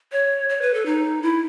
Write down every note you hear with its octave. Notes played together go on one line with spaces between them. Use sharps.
C#5
C#5
B4
A4
D#4
E4